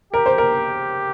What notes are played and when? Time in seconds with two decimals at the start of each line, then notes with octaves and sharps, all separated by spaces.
0.13 G4 A#4
0.26 C5
0.38 A#4